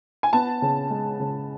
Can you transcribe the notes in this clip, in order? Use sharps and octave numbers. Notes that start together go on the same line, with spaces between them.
G#5
B3 A5
C#3
G#3
C#3